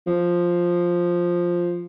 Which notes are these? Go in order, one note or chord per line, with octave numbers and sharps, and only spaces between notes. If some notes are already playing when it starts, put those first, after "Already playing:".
F3